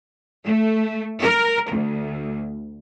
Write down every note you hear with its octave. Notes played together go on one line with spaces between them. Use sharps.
A3
A#4
D2